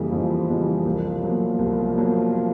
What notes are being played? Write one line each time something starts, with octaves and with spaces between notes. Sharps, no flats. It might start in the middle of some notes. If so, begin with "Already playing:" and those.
Already playing: F2 C#3 E3 G3 A#3
F2 F3
C#3 E3 G3 A#3
C2
A#2 F#3 B3
C2
A#2 F#3 B3